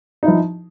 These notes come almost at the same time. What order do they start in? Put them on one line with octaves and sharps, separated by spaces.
D#4 E4 F3